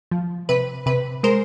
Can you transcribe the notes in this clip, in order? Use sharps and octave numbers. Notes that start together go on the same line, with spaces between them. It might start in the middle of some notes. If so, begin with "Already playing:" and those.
F3
C3 B4
C3 B4
G#3 A#4 C5